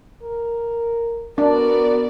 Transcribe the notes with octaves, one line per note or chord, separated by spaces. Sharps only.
A#4
B3 D4 F#4 A#4 D5